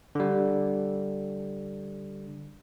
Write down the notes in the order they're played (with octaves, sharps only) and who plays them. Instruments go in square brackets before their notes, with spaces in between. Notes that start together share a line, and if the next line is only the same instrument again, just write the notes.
[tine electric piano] D3 G3